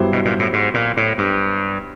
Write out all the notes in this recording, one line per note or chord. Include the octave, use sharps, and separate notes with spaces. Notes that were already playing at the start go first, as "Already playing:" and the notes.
Already playing: G2 F#3 B3 E4 G4 C5
B2
A#2
A2
G#2
A#2
A2
G2